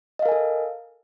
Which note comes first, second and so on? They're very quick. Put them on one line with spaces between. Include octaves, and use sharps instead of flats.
D#5 F5 A#4 G#5 A4